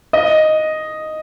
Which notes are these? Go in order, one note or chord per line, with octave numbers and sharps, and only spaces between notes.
D#5